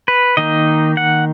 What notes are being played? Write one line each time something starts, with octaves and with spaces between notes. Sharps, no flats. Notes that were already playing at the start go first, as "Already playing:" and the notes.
B4
D#3 A#3 D#4 D#5
F#5